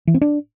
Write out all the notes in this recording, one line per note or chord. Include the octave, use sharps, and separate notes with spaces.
E3
C4
D4